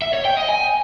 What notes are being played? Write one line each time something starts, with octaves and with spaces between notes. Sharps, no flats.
E5
C#5
G5
D#5
G#5